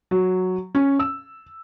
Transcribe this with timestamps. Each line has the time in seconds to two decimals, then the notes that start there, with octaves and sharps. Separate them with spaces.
0.11 F#3
0.75 C#4
0.99 E6